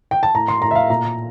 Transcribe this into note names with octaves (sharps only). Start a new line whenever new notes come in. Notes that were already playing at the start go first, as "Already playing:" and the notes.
G5
A5
A2 A#5
C6
A2 A#5
E5
F5
A#2 A#5